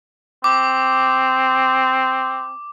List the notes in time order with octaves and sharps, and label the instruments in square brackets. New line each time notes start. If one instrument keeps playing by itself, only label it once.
[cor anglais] C4 [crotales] D6